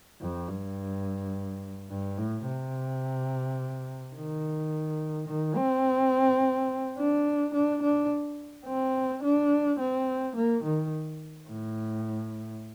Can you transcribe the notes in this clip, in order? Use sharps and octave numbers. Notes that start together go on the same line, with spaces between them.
F2
G2
G2
A2
C3
D#3
D#3
C4
D4
D4
D4
C4
D4
C4
A#3
D#3
A2